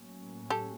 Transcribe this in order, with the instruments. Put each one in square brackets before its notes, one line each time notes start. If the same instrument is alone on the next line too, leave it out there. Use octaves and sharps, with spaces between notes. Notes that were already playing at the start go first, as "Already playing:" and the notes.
Already playing: [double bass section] A2 F#3 A#3 C#4
[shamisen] G4 A4